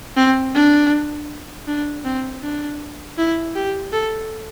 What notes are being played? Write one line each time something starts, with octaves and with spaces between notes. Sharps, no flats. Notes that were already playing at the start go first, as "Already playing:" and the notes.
C4
D4
D4
C4
D4
E4
G4
A4